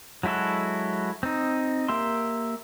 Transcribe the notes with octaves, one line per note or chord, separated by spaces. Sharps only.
F#3 G#3 E4 F#4 A4
C4 D#4
A#3 G4 E5 C6